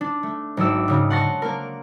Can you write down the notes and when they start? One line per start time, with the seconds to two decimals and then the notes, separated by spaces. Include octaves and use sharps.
0.01 D4
0.23 A3
0.57 G#1 F#3 D5 E6
0.88 G#2 C#3
1.10 F#5 A5 C6 C#6 A#6
1.42 A#3 A#4